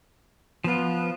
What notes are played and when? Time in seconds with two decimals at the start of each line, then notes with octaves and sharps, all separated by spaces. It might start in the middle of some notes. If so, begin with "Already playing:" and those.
0.64 F3 B3 F4